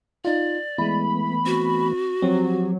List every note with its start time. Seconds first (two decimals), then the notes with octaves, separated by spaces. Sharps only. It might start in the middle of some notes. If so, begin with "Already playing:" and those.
0.25 D#4 F4 D5
0.78 E3 G#3 A3 B3 E4 B5
1.46 C4 F#4
2.22 F3 F#3 C4 G4